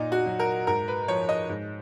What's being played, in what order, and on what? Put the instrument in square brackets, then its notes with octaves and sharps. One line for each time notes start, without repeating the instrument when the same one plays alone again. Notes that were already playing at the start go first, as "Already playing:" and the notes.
Already playing: [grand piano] A#2 D#4
F#4
F#3
A#4
G#2 A#4
B4
F3 C#5
D#5
G#2